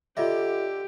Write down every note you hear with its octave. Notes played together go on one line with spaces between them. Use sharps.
D3 F4 G4 D#5 E5